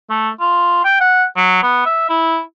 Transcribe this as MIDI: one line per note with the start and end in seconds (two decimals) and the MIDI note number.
0.10 0.29 57
0.40 0.84 65
0.84 0.98 79
1.01 1.25 78
1.37 1.62 54
1.63 1.82 59
1.86 2.06 76
2.09 2.40 64